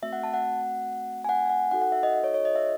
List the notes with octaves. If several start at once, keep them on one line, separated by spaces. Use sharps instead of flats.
A3 C4 F#4 E5
F#5
A5
F#5
G#5
F#5
G#5
F#5
D#4 F#4 A4 F#5
F#5
E5
D#5
D#5
C#5
C#5
D#5
E5